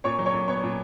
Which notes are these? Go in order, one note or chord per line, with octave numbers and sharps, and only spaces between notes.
A#2 C#5 C#6
F#3
C#5 C#6
A#2
B3 C#5 C#6
A#2